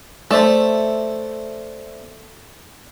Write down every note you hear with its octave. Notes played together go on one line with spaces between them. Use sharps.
A3 C5 D5 E5